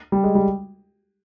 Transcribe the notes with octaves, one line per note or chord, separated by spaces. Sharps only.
G3
G#3
G3